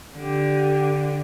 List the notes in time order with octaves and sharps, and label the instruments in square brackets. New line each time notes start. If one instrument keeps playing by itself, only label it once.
[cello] D3 [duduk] G4